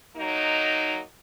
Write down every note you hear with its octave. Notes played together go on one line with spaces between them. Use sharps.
F#3 A#3 D#4